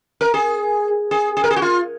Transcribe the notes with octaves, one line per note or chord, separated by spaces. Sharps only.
A#4
G#4
G#4
G#4
A#4
G#4
F#4
F4